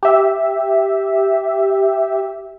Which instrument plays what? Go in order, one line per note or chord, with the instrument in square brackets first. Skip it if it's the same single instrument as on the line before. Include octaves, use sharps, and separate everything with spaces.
[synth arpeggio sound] G4 E5